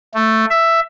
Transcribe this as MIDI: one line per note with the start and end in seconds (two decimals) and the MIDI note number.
0.14 0.45 57
0.50 0.80 76